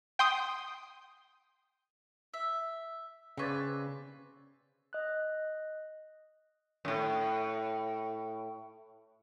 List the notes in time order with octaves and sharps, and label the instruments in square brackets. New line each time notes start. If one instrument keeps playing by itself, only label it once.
[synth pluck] G5 C6 D#6
[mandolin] E5
[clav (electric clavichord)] C#3 C#5 D5 [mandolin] C4 B4
[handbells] D#5 F#6
[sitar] F#2 A2